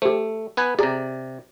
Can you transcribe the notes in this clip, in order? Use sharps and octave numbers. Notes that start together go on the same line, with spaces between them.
A3 G4 C5
B3 B4 G#5
C3 G4 G#4 D5 A#5